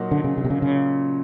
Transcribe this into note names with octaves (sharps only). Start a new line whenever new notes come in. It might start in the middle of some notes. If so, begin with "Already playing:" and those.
Already playing: A#2 F#3 A#3 D#4
D3
C#3
C#3
C3
C#3
C#3